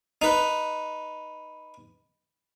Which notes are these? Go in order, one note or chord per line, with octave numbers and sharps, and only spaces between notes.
D#4 B4